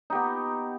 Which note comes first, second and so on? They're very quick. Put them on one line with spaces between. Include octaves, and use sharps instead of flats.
D#4 G4 B3